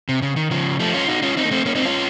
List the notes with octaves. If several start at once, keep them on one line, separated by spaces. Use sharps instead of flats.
C3
C#3
D#3
C#3 F3
F3 A3
C#4 F4
D#4 F#4
C#4 F4
C4 D#4
A#3
A3 C4
A#3 C#4
C4 D#4
C#4 F4